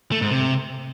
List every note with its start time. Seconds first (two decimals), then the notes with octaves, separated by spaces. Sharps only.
0.12 A3
0.21 G#2
0.31 C3